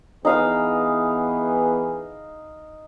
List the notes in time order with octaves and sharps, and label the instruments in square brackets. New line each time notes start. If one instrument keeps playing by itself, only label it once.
[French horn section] E3 B3 G#4 [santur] D#4 F5 D#6